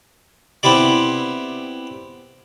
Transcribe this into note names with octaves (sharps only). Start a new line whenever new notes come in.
B3 C4 E4 G4 D5